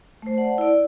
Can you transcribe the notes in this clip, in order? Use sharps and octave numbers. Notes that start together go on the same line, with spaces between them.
A3 C5
D5 F#5 A5
E4 D5